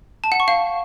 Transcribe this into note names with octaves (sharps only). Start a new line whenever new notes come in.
A5
F#5
C#6
F5